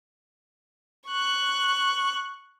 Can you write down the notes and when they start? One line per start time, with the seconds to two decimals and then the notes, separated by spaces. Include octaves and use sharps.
1.08 C#6 F#6